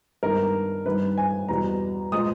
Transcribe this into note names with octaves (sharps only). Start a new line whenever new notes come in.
G2 D#3 G#3 B3 A#4
G2 D#3 G3 B4
G#5
E2 B2 G3 A#5
A#2 G#3 D#6